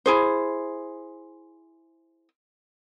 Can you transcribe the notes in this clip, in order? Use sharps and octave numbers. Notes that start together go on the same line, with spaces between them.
E4 G#4 C5